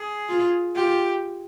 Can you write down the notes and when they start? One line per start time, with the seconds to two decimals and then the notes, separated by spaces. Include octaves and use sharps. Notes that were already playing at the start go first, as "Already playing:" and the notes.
Already playing: G#4
0.29 F4
0.76 F4 G4